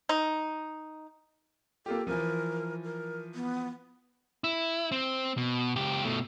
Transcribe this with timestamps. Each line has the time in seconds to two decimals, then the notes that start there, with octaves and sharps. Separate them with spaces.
0.09 D#4
1.86 A#3 F4 G4 A4
2.07 E3 F3 A#4
2.84 A#4
3.35 B3
4.44 E4
4.92 C4
5.38 B2
5.76 C#2 G4
6.05 B2 A3